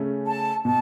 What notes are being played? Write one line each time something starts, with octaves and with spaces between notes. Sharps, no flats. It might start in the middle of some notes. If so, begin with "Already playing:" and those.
Already playing: C#3 A3 C#4
A5
B2 A5